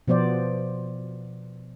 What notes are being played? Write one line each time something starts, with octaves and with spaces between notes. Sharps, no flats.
B2 F3 B3 C5 D5